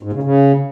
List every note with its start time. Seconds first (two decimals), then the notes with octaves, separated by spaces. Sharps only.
0.03 G#2
0.13 C#3
0.23 C#3